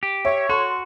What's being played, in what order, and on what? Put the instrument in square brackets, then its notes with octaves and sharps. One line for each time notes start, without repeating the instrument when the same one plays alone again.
[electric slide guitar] G4
[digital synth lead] C#5 [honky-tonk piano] E5
[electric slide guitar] F#4 [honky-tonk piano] A4 C6